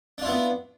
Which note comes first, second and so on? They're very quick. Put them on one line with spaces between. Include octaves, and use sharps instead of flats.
D4 F4 E4 B3